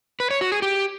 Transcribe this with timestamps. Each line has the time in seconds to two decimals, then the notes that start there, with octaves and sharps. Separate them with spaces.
0.20 B4
0.31 C#5
0.41 F#4
0.52 G#4
0.62 G4